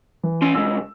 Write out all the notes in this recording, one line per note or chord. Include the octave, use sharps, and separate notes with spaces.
E3
C#4 G#5 C6
C2 G#3 E6